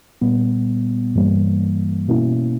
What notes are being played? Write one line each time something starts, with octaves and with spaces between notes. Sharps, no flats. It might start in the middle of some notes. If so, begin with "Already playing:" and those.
A#2 G3 B3
G2 E3 G3 A#3
B2 A#3 C#4 E4